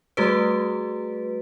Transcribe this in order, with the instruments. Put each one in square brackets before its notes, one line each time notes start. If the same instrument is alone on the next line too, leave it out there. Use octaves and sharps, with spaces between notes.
[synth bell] G3 A3 F#4 G#4 B4